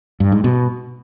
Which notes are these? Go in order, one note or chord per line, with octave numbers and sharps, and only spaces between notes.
G2
G#2
B2